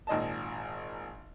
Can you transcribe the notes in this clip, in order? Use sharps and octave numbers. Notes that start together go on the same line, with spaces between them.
G#1 A#2 D#5 G#5 A5